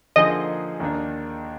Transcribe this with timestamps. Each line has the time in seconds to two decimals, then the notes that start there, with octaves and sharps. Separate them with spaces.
0.16 D3 F3 A#3 D#4 G#4 D#5
0.80 D#2 D#3 A#3 D4